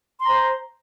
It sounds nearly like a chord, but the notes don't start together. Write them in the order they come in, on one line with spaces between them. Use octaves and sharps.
C6 A#5 C5